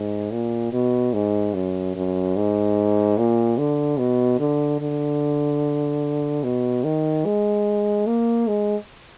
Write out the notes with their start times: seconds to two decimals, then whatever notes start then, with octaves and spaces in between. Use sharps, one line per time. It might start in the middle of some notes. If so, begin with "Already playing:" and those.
Already playing: G#2
0.32 A#2
0.73 B2
1.13 G#2
1.54 F#2
1.96 F#2
2.36 G#2
3.18 A#2
3.58 D3
3.99 B2
4.39 D3
4.81 D3
6.44 B2
6.84 D#3
7.25 G#3
8.07 A#3
8.48 G#3